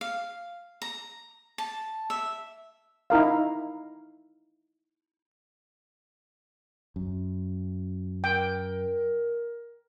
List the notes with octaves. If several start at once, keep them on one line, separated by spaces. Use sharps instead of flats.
F5
A#5
A5
E5
D#4 E4 A#4 F5
F#2
A#4 G5